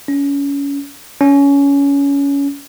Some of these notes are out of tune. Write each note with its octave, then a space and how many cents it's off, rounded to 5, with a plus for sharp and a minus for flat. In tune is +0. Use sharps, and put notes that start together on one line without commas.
C#4 +25
C#4 +20